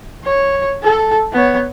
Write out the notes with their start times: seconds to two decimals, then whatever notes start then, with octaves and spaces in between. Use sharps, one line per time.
0.24 C#5
0.83 A4
1.32 B3 C#5